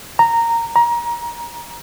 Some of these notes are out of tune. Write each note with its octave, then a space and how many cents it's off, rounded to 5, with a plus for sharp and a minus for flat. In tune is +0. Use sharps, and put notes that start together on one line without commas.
A#5 -10
A#5 +25